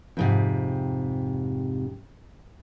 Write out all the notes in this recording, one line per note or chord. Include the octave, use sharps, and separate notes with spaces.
F2 G#2 C3